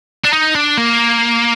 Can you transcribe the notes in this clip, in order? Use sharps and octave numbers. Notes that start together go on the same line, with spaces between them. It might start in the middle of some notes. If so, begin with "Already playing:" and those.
D4
D#4
D4
A#3